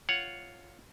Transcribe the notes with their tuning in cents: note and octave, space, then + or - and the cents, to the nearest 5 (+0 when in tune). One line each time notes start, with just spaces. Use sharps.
F4 +0 C#5 +0 F#5 +0